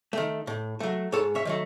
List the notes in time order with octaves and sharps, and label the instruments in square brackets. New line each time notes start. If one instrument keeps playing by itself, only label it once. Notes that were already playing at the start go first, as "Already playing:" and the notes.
[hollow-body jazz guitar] D#3 A3
A2
F#3 A3
G#2 A4 C#5
C#5 E5
D#3 F#3 A3